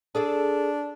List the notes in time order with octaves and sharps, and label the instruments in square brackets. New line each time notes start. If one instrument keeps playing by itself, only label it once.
[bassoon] D4 [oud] G#4 A4 D5